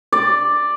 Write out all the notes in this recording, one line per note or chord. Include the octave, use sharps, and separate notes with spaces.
D5